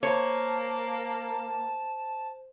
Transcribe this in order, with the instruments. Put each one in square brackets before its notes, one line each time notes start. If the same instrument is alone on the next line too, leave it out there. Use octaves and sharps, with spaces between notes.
[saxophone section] A#3 [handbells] C5 [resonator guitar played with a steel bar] C#5 [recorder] A5